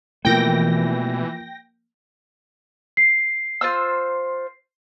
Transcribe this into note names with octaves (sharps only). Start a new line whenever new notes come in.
B2 E3 F3 A3 A#3 G5 A#6
C7
F4 C5 E6